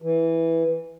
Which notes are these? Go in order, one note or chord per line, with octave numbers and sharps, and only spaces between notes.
E3